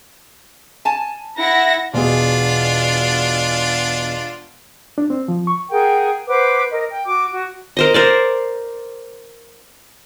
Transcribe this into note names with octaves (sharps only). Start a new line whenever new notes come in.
G#5 A5
E4 F#5 A#6
E1 B2 D4 F4 G#4
D4
C4
F3
C#6
G#4 A#4 F#5 G5
B4 C5 F#5 D6
A#4 D#5
G5
F#4 D6
F#4
A#4 C5 D#5
A#4 C5 D5